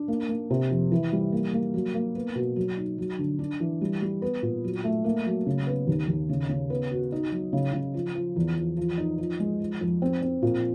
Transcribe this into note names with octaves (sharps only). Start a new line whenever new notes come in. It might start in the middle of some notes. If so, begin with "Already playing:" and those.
Already playing: D4
A#3
A#3
C3
F2
E3
G3
A#3
A#3
F#3
A#3
B3
B2
F#3
D#4
F#3
D3
D4
E3
G3
G3
B3
A#2
F#3
A3
A#3
F#3
C#3
B3
D#2
D#2
C#3
C#3
B3
F#4
D#4
F#3
C#3
C#3
F3
F3
E2
F3
F3
D#4
F3
G#3
F3
F2
C4
C4
A#2